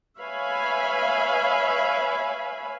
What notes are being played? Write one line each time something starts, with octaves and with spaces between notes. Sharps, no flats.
B4 C#5 E5 F5 G#5 B5